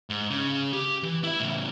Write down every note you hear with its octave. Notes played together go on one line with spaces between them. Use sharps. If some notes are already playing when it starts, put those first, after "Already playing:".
G#2
C#3
G4
E3
E4 E5
A2 C#3